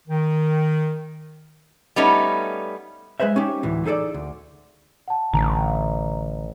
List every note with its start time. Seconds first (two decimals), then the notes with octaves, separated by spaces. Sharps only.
0.08 D#3
1.96 G3 A3 B3 C#4 D#4
3.20 G#3 G#4 B4 C5 E5
3.36 C#4 D#4 G4
3.63 D2 A2 E3
3.85 D#4 G#4 A4 B4 D5
4.14 D2
5.08 F#5 A5
5.34 A1 D3 A#5